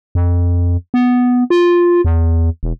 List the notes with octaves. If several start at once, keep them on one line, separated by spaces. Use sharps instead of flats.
F2
B3
F4
E2
E1